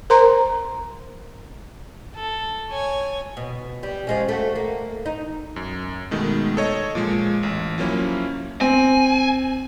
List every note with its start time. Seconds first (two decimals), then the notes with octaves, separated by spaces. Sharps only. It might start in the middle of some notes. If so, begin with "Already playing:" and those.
0.10 A#4 C5 A#5 C6
2.16 A4
2.70 C#5 G#5
3.37 B2
3.83 G3
4.07 F3 G#3 C#4
4.29 A3 F#4
4.56 A#3
5.06 D#4
5.56 F#2
6.11 B2 D#3 G#3 A3
6.57 A4 C#5 D#5
6.95 A#2 F3 G#3
7.43 A1
7.78 F3 F#3 A#3 C#4 E4
8.61 C4 G#5